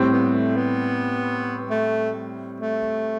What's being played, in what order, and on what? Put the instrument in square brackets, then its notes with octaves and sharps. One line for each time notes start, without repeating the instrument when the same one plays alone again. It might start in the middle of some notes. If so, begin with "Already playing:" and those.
Already playing: [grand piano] A2 G3 C4
[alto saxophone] B3
A3
B3
A3
A3